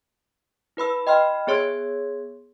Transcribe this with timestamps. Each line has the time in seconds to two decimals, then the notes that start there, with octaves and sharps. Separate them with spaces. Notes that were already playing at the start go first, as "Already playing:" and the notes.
0.77 E4 B4 B5 E6
1.07 D#5 G5 B5 C6 F6
1.47 B3 G#4 C#5 C6 E6 G#6